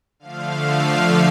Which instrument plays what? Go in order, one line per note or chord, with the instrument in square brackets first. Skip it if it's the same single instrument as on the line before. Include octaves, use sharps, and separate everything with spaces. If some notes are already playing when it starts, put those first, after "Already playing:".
[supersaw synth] D3 F3 A3 F5